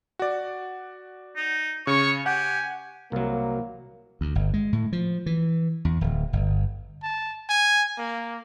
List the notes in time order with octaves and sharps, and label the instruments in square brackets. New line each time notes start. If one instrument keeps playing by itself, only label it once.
[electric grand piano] F#4 D5
[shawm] D#4
[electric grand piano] C#3 [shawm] C#5 [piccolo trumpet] C#6
[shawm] G4 [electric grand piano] F#5 [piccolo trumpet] G#5
[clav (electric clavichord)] C2 F#3 [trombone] A#3
[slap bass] D2
G1
G#3
A2
F3
E3
E2
D1
G1
[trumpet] A5
G#5
A#3